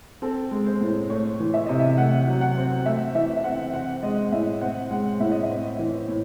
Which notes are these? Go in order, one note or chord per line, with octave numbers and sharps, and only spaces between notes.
C4 A4
G#3
C5
A2
A3 C#5
E3
E5
C3 D#5
E5
A3 F#5
F#3
F#5
C4
A3 E5
E3 E5
E5
C4 F#5
C4 F#5
G#3 D#5
A2 E5
C4 F#5
G#3 F#5
A2 E5
D#5
E5
C4
E3
A2